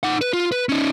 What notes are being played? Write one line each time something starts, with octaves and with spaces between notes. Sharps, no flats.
D#4 F#5
B4
F4
B4
C#4 D#4